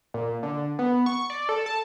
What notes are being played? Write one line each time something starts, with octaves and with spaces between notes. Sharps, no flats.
A#2
D3
B3
C#6
D5
A4
A5